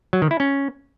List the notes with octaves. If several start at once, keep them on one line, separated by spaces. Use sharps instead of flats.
F#3
D#3
E4
C#4